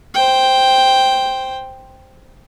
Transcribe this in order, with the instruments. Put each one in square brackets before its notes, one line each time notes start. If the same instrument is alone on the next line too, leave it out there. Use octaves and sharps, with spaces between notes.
[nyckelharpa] C5 G5